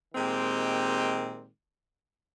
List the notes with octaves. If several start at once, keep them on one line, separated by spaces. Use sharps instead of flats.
A#2 D#3 G#3 C4 G4